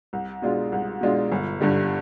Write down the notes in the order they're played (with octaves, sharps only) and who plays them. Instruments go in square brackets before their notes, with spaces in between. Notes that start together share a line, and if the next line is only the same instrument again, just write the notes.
[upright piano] C2
B2 G#3 D4 F4
C2
B2 G#3 D4 F4
G1
G2 D3 G3